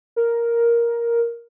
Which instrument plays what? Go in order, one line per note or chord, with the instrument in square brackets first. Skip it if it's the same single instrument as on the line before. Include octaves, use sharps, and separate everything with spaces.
[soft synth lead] A#4